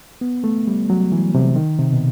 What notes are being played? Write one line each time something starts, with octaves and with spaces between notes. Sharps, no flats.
B3
A3
G3
F#3
E3
C3
D#3
C3
B2